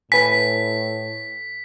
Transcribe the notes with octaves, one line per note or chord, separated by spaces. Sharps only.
A2 B4 G#5 B6